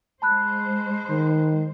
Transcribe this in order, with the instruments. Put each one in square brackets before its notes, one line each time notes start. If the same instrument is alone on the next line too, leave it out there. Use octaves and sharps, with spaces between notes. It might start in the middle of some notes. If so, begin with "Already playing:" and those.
[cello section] G#3 C5 [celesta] A5 B5 F#6
[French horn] D#3